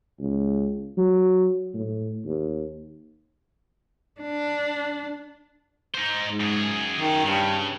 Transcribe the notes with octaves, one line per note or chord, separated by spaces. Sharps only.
C#2
F#3
A2
D#2
D4
D#4 C5
G#2
F#2 G#4
D#3
G2 C#3